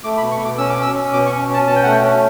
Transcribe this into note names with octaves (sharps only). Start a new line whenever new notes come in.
A3 D6
B5
B2
C#6
B2 D6
C#4 E6
D6
C#4
E6
C#4
B2 D6
C#6
C#4
C#4 A5
B2 A5
G5
A3 F#5
G5
C#4